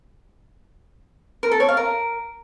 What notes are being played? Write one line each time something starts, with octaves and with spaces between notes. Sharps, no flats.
A#4
A4
C#5
F5
A#4